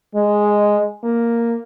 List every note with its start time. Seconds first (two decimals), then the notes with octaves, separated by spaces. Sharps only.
0.15 G#3
1.04 A#3